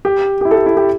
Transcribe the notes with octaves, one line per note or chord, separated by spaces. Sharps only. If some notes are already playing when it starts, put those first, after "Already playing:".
G4
G4
E4
A4
G4
E4
G4